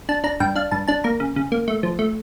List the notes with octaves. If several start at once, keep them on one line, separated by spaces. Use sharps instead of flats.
D4 A5
D4 A#5
G2 G5
D4 F5
G2 A5
D4 A5
A#3 A#5
C#3
C#3
A#3
A3
F3
A3